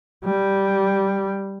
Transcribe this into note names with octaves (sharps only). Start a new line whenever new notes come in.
G3